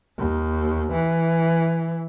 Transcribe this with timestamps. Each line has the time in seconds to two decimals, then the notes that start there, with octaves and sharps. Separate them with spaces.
0.18 D#2
0.92 E3